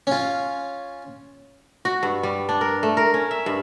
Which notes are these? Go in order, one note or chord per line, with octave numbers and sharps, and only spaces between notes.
C#4 F4
F#4
G2
G3
D4
A#4
A3
A#4
C#4
E5
G2